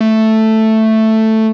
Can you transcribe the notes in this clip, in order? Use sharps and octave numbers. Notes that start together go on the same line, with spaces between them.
A3